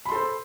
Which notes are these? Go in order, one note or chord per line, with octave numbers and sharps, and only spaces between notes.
A4 C5 B5 C6